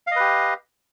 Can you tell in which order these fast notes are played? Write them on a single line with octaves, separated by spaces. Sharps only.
F5 D#5 B4 G4